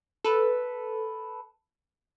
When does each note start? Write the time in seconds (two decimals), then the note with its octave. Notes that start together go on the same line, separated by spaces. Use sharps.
0.24 A4 B4